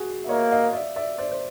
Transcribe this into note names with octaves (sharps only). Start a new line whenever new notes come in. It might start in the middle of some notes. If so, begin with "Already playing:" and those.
Already playing: F#4 G#4
E5
A#3 C#5 D#5
D#5 F5
D5 E5
D5 E5
C5 D5
C5